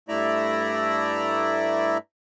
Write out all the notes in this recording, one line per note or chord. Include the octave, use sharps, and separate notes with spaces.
G2 A3 E4 D5 E5 A#5